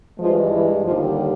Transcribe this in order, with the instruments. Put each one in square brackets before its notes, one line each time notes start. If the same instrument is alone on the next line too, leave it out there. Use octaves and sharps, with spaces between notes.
[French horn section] G2 E3 F3 G#3 F4
E3 E4
D#2 D3 F3 G3 F4